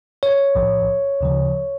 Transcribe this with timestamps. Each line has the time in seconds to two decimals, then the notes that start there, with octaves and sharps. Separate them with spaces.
0.23 C#5
0.55 B1 A2 F3
1.21 D2 C#3 F3